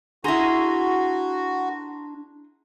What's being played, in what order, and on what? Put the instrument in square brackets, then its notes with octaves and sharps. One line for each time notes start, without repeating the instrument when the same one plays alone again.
[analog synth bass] D4 [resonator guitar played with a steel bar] E4 G#4 [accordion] F#4 [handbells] A#5 C6 A#6